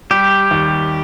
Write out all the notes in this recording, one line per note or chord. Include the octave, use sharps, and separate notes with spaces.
G3 G4
D#2